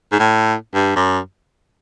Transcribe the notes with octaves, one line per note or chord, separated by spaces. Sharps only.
G#2
A2
G2
F#2